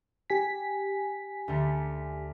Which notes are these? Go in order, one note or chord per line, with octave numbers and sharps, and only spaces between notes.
G4 G#5 B6
D2 D3 C#7